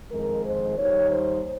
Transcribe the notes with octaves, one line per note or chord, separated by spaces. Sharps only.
F2 D#3 G#3 A#4
C5
D#2 D#3 G3 C#5
C5